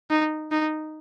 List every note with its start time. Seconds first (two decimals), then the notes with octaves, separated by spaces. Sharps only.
0.10 D#4
0.51 D#4